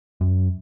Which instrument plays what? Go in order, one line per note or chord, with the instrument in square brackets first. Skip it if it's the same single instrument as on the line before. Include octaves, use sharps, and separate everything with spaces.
[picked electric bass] F#2